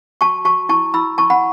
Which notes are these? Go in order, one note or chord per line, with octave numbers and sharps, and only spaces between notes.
F#4 A5 C#6
F#4 A5 C#6
E4 A5 C#6
E4 B5 E6
E4 A5 C#6
F#5 B5